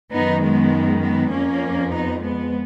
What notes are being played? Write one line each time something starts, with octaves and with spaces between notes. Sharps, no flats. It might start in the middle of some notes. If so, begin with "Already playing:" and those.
F#2 D#3 B3 D#4
G#3 B3
G#3 B3
F2 F3 A#3 C#4
B3 D#4
G#3 B3